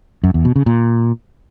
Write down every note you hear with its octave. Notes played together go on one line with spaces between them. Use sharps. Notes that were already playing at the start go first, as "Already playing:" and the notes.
F#2
E2
B2
C#3
A#2